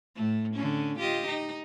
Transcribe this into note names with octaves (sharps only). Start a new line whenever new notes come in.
A2 A3
D3 C#4
F4 G4 D#5
D#4